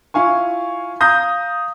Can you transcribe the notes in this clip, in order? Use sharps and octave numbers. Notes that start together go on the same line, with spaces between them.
E4 F4 F5 G#5 C#6
F5 A#5 D#6 G6 A#6